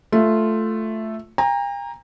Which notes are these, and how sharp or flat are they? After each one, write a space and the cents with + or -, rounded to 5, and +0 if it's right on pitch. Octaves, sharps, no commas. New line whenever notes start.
A3 +0 F4 +0
G5 +45 A#5 +0